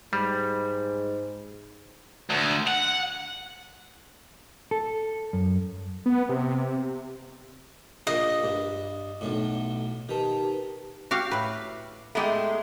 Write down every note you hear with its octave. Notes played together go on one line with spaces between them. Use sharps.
G#2 G3
D2
F#5
A4
F#2
B3
C3
A#1 A#2 D#5
G2
B1 A2
D#3 G4 B4 A5
F#4 G4 F5
A2 B4
G#3 A3 B3 D#4 G4